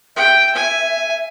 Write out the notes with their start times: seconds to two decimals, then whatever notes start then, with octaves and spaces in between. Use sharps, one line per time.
0.17 E5 G5
0.55 G#5